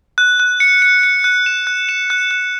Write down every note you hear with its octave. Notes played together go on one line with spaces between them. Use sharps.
F#6
F#6
C#7
C#7
C#7
F#6
E7
F#6
E7
F#6
F#6